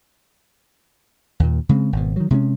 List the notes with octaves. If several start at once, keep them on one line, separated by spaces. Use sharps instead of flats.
D#2 A#2
C#3 G#3 B3 C4
G#1 B2
D#3 F#3
C3 G#3 B3 C#4